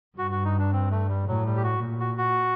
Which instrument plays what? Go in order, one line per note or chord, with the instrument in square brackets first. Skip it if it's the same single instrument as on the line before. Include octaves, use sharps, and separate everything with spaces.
[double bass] G2 [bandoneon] F#4
[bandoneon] F#4
D#4
D4
C4
A3
G3
[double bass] A2 [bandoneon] F#3
[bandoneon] G3
G4
F#4
[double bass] A#2
[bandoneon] F#4
F#4